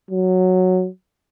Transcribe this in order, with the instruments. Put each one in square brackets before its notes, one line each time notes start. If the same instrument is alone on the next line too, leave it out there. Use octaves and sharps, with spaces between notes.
[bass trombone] F#3